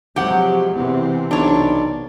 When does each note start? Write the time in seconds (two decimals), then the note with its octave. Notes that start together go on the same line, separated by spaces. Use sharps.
0.16 C3 F3 F#3 G#3 G4 F#5
0.76 E2 C3 E3 C4
1.31 B1 D4 C#5